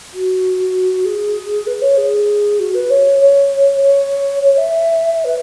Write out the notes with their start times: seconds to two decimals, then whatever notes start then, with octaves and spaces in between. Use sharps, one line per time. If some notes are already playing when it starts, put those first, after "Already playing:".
0.14 F#4
1.05 G#4
1.67 B4
1.82 C#5
1.97 G#4
2.59 F#4
2.74 B4
2.90 C#5
3.20 C#5
3.81 C#5
4.43 C#5
4.57 E5
5.24 B4